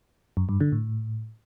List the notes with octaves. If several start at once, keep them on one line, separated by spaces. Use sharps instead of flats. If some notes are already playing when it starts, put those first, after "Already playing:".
F#2
G2
D3
A2